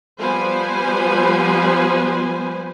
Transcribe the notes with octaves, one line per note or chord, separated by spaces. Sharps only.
F3 G3 B3 B4 C5 G#5